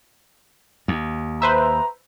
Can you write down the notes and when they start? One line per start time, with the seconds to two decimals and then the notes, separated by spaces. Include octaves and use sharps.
0.88 D#2
1.42 B4 C5 E5 A#5